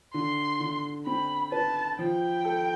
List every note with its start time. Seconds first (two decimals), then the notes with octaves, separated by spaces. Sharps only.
0.14 D3 C6
0.60 D3
1.06 C4 B5
1.52 B4 A5
1.98 F3 G5
2.45 A4